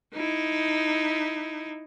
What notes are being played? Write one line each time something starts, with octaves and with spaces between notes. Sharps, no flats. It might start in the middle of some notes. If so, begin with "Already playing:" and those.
D#4 E4